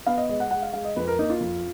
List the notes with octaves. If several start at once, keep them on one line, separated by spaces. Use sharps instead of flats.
B3 F5
D#5
G#3 D#5
F#5
G#3 F#5
F5
G#3 F5
D#5
F2 B4
A#4
A#3 D#4
F4
F2